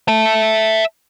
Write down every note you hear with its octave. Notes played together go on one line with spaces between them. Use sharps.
E5 A5